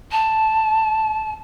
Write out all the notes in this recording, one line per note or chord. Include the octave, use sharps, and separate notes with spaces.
A5